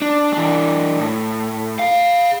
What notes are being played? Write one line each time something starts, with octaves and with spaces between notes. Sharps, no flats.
D4
E3 D4
A2
G#4 F5